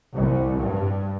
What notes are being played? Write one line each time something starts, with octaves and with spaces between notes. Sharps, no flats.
C2
G2